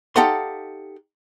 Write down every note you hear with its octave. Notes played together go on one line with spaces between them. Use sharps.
D#4 G4 A4 F5 F#5 C6